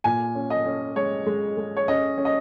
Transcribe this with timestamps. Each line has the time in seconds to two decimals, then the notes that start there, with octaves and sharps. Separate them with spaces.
0.04 A#2 G#5
0.35 C#4
0.50 D#5
0.66 C#4
0.96 G#3 C#5
1.26 G#3
1.57 G#3
1.77 C#5
1.88 C#4 D#5
2.18 C#4
2.25 D#5